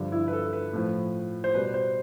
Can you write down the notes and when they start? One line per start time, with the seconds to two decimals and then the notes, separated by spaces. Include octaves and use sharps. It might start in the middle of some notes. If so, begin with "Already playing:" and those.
Already playing: G2 D3 F3
0.12 E4
0.28 B4
0.33 A4
0.53 B4
0.73 A2 F3
1.44 C5
1.54 B2 G3 B4
1.74 C5